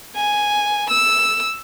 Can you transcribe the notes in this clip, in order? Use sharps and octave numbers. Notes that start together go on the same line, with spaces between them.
G#5
E6